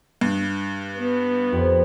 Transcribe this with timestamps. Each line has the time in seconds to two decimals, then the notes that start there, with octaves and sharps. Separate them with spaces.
0.21 G2
0.97 B3
1.52 F2 G4